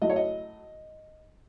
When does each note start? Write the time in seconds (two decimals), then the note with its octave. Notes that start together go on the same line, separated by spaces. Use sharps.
0.01 F#3 A3 E4 D#5
0.10 C#5
0.16 D#5